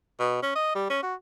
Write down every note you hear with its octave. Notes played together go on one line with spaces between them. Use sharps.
B2
C#4
D#5
G3
C#4
F#4